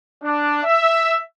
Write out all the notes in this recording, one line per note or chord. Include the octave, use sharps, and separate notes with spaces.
D4
E5